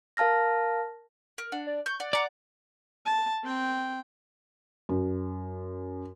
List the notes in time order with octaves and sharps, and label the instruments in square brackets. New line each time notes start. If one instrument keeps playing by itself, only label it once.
[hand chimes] A#4 F5 A5 F6 A#6
[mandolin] A#4
[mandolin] D4 [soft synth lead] F#5
[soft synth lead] D5
[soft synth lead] C#6 [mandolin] G6
[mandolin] D5 [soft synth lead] F#5
[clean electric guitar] D5 [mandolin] F#5 A#5 [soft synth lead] D6
[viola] A5
C4 G5
[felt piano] F#2